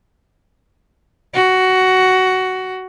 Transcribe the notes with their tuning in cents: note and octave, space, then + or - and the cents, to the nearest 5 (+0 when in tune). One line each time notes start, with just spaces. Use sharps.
F#4 +10